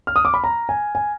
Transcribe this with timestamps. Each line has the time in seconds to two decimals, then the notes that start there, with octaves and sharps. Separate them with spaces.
0.07 F6
0.16 D#6
0.25 D6
0.34 B5
0.44 A#5
0.69 G#5
0.95 G#5